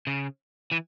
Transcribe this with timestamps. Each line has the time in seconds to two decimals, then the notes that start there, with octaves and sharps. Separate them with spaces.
0.07 C#3
0.72 E3